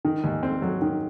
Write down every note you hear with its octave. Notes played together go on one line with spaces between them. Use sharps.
D#3
D#2
C4
F#3
D#3